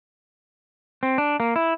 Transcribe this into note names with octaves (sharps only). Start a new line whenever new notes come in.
C4
D4
A#3
E4